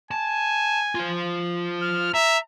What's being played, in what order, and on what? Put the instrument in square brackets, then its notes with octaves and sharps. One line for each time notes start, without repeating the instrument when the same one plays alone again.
[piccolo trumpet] G#5 [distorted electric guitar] A5
[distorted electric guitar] F4 C5
[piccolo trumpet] F6
[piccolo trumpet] E5 [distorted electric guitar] A#5